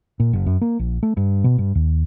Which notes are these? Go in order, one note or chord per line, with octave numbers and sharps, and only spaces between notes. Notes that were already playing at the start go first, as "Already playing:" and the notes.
A#2
F#1
F#2
A#3
A#1
A3
G2
B2
G2
D#2